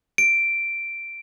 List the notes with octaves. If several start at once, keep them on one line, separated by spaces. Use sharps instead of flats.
D7